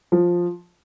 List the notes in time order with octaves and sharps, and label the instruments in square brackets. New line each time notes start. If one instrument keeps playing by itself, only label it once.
[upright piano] F3